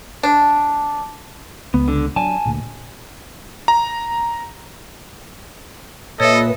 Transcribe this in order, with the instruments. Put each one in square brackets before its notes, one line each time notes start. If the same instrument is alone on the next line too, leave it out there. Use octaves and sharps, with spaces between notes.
[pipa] D4
[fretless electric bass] C#2 [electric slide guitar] B3
[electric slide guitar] D3
[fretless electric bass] F#3 D4 [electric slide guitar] G#5 A5
[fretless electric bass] D2 A#2
[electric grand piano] A#5
[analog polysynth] A#2 B4 [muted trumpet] A4 [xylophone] C#5 E5 [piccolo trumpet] D#5